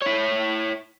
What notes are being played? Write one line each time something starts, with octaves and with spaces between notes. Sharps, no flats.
E4 C#5